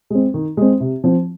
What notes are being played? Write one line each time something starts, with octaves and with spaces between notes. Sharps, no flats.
G#3 C4
D#3
G#3 C4
C3
F3 C4